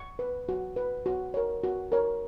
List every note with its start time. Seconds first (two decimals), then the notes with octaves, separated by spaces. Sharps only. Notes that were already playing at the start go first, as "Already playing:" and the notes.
Already playing: C#6
0.19 B4
0.49 F#4
0.76 B4
1.06 F#4
1.34 A#4 C#5
1.64 F#4
1.92 A#4 C#5